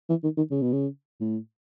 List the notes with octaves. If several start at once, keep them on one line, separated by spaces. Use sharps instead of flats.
E3
D#3
D#3
C#3
B2
C#3
A2